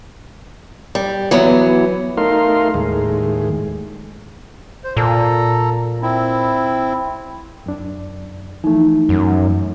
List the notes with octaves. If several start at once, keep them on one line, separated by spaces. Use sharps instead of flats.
G3
E3 F#3 B3
A3 D#4 A#4 F5 C6
D#2 A2 G#3
C5
A#2 A4 A#5
C4 E4
F#2 D4
E3 F3 A3 D#4
F#2